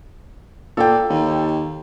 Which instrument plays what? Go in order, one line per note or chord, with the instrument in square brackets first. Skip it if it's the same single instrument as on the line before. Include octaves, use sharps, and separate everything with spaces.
[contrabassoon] A#2 [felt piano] A4 G5
[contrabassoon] D#2